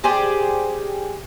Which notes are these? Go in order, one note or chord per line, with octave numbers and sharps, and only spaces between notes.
G4 G#4 C5 D5